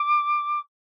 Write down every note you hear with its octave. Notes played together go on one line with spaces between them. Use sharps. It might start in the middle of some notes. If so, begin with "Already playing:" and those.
Already playing: D6